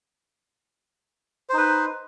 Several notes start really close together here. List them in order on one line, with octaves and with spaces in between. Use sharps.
C5 D#4 B4